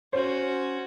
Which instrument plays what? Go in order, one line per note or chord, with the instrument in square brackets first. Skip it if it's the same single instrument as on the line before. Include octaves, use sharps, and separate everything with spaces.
[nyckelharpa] C#4 F#4 [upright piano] C5